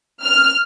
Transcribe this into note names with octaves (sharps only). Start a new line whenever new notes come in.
F6